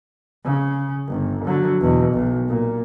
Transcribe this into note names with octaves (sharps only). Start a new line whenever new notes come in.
C#3
G1
D3 F#3
E2 B2
B1
A#2